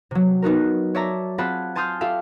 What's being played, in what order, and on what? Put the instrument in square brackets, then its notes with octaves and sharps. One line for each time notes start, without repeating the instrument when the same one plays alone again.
[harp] C3 F#3
B3 D#4 F#4 A#4
C#5 D5 E5 A5 A#5
C4 F4 G#4 F#5 A5 B5
G#5 A5 C6 D#6 F6 G6
F4 G4 A4 E5 F5